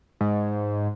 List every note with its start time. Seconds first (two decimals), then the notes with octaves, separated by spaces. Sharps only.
0.21 G#2